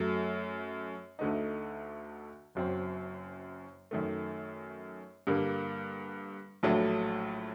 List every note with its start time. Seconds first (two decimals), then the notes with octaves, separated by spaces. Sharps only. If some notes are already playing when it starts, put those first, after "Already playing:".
Already playing: F#2 F#3 A3
1.19 D2 D3 A3 D#4
2.55 F#1 F#2 F#3 C4
3.91 F#2 D#3 A3
5.27 G2 D3 G3 A#3
6.63 A#1 A2 F#3 A3 D4